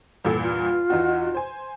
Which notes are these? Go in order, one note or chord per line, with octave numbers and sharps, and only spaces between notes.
E2 G2 A#2 A4
F4
E2 D#4 F#4
C5 G#5